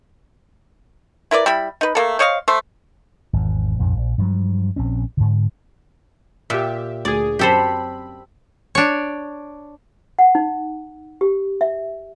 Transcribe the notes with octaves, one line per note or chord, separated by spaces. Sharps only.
E4 A#4 B4 D5
G3 E4 B5
D#4 B4
A3 A#3 A4
C5 C#5 D#5 F5
A3 C5
G#1 E2
A#1 F2 G#2
A#1
G2 F3 F#3
A#1 C4 C#4
G#2 D3
A#2 G4 E5
D2 G#4 D5
F#2 C4 G4 A4 C5 B5
D4 C#5
F#5
D#4
G4
E5